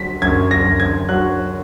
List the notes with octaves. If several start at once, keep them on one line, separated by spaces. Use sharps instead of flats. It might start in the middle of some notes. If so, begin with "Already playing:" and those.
Already playing: F#3 B6
F#2 G#6
A#6
F#2
G#6
F#3 F#6